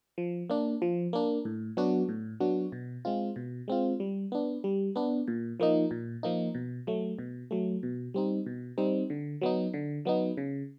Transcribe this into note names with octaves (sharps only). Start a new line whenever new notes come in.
F3
A#3 D4
F3
A#3 D4
A2
F#3 B3 D4 F#4
A2
F#3 B3 D4 F#4
B2
G#3 C4 F4
B2
G#3 C4 F4
G3
B3 D4
G3
B3 D4
A#2
F3 A#3 D#4
A#2
F3 A#3 D#4
B2
F#3 A3
B2
F#3 A3
B2
G3 C4 D#4
B2
G3 C4 D#4
D3
F#3 B3 D#4
D3
F#3 B3 D#4
C#3